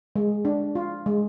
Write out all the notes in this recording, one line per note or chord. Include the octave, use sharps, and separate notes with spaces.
G#3
D4
F4
G#3